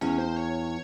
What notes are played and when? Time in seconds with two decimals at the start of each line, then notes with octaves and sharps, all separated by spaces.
0.01 E2 C#4
0.18 C5
0.36 C#5